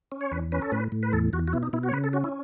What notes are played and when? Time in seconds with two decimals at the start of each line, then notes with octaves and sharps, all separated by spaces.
0.12 C#4
0.21 C#5
0.32 E2 B4
0.52 C#4 B4
0.62 A4
0.72 A2 B4
0.92 A2
1.03 B4
1.13 E2 A4
1.33 E2 F#4
1.48 F#4
1.53 B2 E4
1.63 D#4
1.73 B2 E4
1.83 F#4
1.89 C#5
1.93 C#3 B4
2.04 A4
2.13 C#4 F#4
2.24 E4